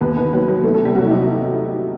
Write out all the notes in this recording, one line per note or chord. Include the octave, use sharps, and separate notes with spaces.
D#2 B3 B4
D#3 B3 B4
F#3 B3 B4
F#3 B3 B4
E3 A3 A4
A3 A4
C3
G3 G4
C3 F#3 F#4
E4
C3 D#4